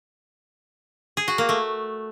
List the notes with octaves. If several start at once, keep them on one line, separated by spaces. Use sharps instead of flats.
G#4
F#4
A#3
A3